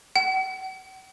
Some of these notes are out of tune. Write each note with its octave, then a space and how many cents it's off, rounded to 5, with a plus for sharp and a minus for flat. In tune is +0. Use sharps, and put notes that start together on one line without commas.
F#5 +45